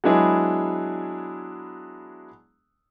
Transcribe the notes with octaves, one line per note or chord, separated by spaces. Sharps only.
F#3 G#3 B3 D4 E4 G#4